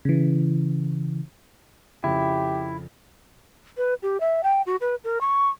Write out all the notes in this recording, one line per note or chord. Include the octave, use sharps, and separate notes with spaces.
C#3 E3
F2 C#3 E4 G4
B4
G4
E5
G5
F#4
B4
A#4
C#6